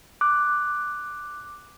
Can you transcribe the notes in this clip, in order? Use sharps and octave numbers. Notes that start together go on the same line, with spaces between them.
D6 F#6